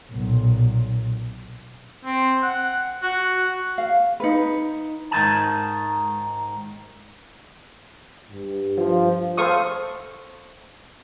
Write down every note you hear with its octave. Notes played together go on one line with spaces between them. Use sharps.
B1 A#2
C4
F#5
F#4
F5
D#4 B4
G#2 D#3 G#5 A5
G2
F3
A4 C5 F5 C#6 D#6